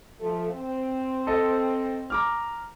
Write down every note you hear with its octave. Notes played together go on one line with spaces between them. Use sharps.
F3 A3
C4
A4 D#5
A#5 D6 F6